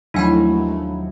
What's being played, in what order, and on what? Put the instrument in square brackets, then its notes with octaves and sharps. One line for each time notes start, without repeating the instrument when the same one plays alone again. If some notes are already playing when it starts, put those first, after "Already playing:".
[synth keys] D#2 F3 F#3 [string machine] A3 [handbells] D4 G#5 B5 [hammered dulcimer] E4